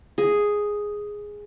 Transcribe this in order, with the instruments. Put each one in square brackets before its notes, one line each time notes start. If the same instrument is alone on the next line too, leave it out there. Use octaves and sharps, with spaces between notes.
[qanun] G#4